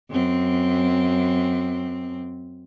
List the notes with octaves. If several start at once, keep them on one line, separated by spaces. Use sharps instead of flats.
F#2 C4